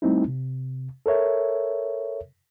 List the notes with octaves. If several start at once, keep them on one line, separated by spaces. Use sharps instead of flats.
G3 A3 C4 D#4 E4
C3
A4 A#4 C#5 E5